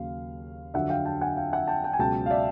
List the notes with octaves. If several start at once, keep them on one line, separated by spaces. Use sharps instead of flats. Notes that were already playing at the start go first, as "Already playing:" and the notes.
Already playing: D#2 C#3 F#3 F5
F2 D3 F#3 E5 F#5
F5 G5
G5 A5
F#5 G#5
F5 G5
E5 F#5
G5 A5
G5 A5
G#5
C#2 B2 F#3 G5 A5
F5
D5 E5